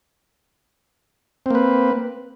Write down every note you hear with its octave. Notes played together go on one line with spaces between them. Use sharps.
A#3 C4 B4